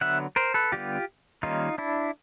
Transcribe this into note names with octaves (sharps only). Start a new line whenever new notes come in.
D3 F#3 B3 E5 F#5
A#4 C5
A4 B4
D3 G3 B3 F4 G4
D#3 G3 A#3 C#4 D#4 F4
D4 E4